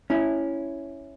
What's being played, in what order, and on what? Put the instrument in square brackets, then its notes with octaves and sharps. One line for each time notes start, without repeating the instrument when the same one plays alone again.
[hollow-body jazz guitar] C#4 E4